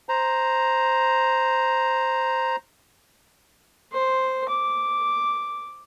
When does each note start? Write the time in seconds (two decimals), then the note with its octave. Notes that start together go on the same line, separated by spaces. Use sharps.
0.09 C5 A#5
3.92 C5
4.49 D6